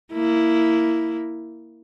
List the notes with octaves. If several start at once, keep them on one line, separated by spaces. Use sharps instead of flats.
A#3 E4